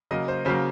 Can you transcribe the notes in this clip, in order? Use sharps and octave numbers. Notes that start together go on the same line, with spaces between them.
C#3 F#3 A#3 D#5
C5
C#3 F#3 A#3 C5